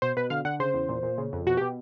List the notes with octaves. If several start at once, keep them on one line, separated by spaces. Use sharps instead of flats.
B2 C5
B2 B4
D3 F5
D3 F#5
C#3 C5
E2
A#2
A#2
C#3
F2
B2 F#4
B2 G4